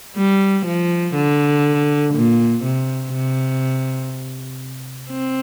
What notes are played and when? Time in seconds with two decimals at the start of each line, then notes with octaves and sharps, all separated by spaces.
0.16 G3
0.66 F3
1.15 D3
2.14 A#2
2.63 C3
3.13 C3
5.11 C4